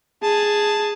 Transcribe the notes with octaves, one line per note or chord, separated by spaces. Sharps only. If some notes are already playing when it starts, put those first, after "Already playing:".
G#4 A5